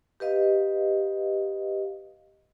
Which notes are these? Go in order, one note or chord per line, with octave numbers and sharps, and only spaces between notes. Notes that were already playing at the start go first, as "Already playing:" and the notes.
G4 B4 D#5 F5